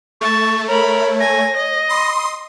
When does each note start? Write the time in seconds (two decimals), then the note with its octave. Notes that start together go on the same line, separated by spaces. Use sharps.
0.21 A3 A5 C#6
0.68 A#4 C#5 A#5 B5
1.20 G#5 A#6
1.56 D#5
1.89 B5 C6 D#6